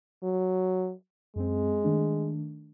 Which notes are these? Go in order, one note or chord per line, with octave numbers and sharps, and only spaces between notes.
F#3
F#2 G#3 C4
D#3 A3 D4